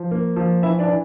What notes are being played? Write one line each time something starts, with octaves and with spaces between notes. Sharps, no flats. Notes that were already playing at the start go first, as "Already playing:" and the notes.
Already playing: F3
A#3
F3
E3 E4 E5
D4 D5
E3